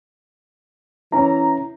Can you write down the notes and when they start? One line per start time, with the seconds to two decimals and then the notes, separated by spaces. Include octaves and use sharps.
1.12 E3 C#4 E4 A#5